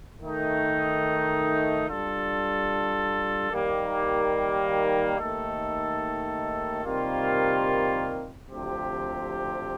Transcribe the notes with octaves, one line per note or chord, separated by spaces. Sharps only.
D#3 A3 D#4
G3 D4 F4 A4
D#2 D#3 G3 A#3
D#2 D#3 A3 D#4 A4
C3 D#3 G3 A#3 F4
D2 C3 F3 C4 G4